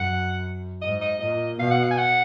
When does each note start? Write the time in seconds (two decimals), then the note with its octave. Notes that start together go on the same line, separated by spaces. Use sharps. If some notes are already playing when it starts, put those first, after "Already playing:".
Already playing: F#2 F#5
0.81 G#2 D#5
1.01 D#5
1.20 A#2 D#5
1.59 B2 F5
1.71 F#5
1.83 F5
1.91 G#5
1.98 F#5